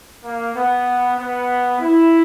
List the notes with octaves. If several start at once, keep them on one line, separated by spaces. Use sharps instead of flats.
A#3
B3
B3
E4